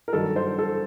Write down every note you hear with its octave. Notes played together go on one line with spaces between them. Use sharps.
A#4
G2 D#3 F#3 A4
C5
A4